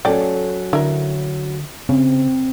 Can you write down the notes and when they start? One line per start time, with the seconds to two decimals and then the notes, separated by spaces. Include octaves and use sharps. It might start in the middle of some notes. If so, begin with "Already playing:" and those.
0.05 F#3 C#4 A4 D5 G5
0.73 D3 E4 A#4
1.89 C#3 C4